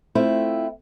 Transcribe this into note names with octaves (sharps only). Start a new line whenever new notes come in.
A3 C4 E4 F4